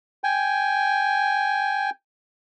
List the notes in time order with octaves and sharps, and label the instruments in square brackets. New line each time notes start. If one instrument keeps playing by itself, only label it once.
[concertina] G5 G#5